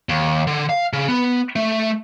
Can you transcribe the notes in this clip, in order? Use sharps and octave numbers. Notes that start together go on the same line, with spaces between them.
D#2
D3
F5
C#3
B3
A3